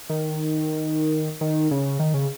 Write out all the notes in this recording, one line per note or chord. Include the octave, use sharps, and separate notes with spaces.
D#3
D#3
C#3
D#3
C#3